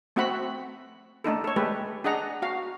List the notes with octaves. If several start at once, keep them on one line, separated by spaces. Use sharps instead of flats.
A3 C4 F#4 E5 F#5 B5
A3 D4 D#4 A4
A4 C#5
G#3 A3 G4 B4
D4 G#4 D#5 F#5 A#5
F#4 F5